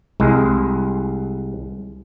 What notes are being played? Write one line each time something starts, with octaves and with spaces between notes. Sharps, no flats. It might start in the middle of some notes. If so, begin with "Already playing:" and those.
C2 G#3